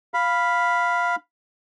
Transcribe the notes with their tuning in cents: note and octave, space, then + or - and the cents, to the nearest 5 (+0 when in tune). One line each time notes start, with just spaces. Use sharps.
F5 +0 B5 +0